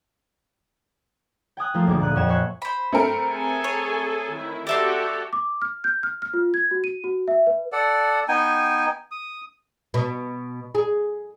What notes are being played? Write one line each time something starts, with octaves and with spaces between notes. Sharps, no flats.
G5 G#5 D#6 F#6
F3 A3 A#3 F4
D#1 D2 G#4 D6
A#2 F#6 D#7
F2 C#5 F#5 G#6 E7
C5 E5 G#5 C#6 F#6
C5 B5
A3 C4 A#4
G#4 A4 G#5
C#5
D#3 E4
F#4 G4 A4 D5 E5 C6
D6
F6
G6
F6
F6
F4
G#6
F#4
D#7
F#4
E5
B4
A4 D5 F#5
B3 D#4 G5 G#5
D#6
B2
G#4